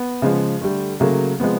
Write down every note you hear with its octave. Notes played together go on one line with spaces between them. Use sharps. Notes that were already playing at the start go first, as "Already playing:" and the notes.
Already playing: B3
C#3 F3 G#3
D3 G3 A3
C#3 F#3 A3 A#3
C3 F3 G#3 B3